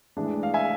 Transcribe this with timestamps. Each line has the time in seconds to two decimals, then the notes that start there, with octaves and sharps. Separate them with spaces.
0.17 A2 E3 G#3 D4
0.43 F5
0.54 E5 G#5